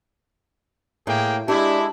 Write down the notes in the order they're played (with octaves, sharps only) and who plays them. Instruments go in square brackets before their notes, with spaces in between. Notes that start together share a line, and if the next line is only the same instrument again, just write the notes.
[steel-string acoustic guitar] A2 [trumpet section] A#3 G#4 G5
[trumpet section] G#3 E4 [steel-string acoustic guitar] D4 [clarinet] G4